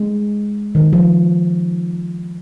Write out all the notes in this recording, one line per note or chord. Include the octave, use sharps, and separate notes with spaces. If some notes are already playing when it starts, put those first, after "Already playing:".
Already playing: G#3
D#3
F3